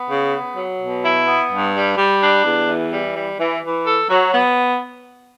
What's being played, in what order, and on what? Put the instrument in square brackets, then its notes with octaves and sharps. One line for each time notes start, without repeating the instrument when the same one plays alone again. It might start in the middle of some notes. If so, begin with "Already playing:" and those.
Already playing: [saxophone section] B3
C#3
B3
F#3
B2
E4
B3
G2
G3
G3
D4
E2
E3
G3
G3
E3
E3
A4
F#3
B3